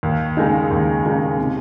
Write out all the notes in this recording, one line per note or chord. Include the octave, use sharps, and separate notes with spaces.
D#2
C#3 G#3 D#4
D#2
C#3 G#3 D#4
C3